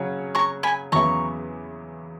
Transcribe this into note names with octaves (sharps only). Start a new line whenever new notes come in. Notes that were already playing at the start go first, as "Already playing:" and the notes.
Already playing: C#3 F#3 C#4 F#4 C#5
A#5 C#6
G#5 B5
E2 C#3 F#3 B3 E4 A#5 C#6